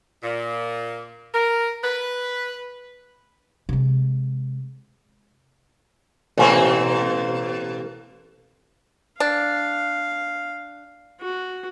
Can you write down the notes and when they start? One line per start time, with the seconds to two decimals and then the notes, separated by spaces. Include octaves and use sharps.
0.23 A#2
1.34 A#4
1.83 B4
3.69 C3 G#3
6.38 A1 B2 A#3 C4 C#4 F4
9.20 D4 F5
11.21 F#4